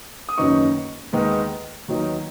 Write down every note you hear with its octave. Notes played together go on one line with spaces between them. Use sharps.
D#6
F#1 F#2 D#3 B3 D#4 C#6
D#2 D#3 G#3 B3 D#4
D#2 D#3 F#3 B3 D#4